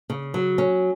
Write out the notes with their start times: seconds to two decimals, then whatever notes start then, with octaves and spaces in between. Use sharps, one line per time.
0.10 C#3
0.34 F#3
0.58 C#4